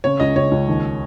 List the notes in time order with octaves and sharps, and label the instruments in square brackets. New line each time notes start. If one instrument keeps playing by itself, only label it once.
[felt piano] C#3 [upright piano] C#5
[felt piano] C#2 [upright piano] D#5
[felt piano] C#2 [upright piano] C#5
[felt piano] C#2
D#2